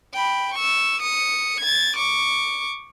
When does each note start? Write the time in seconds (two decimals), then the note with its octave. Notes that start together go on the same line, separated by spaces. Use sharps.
0.14 G5 B5
0.54 C#6 E6
1.01 D#6 C#7
1.61 G#6 A6
1.97 C#6 D6